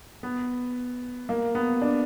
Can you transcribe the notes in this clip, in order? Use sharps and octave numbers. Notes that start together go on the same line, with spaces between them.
B3
A#3
B3
D4